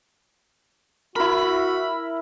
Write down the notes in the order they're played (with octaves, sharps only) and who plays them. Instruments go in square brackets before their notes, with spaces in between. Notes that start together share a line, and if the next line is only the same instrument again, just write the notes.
[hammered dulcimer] E4 A#4 [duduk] F#4 [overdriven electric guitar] B5